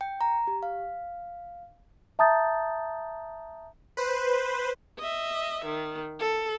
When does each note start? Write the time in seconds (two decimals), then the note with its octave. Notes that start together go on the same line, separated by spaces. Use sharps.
0.01 G5
0.21 A#5
0.47 G4
0.63 F5
2.19 E5 A5 A#5 D#6 G6 A6
3.97 B4 C5
4.99 D#5 E5
5.65 D#3
6.20 A4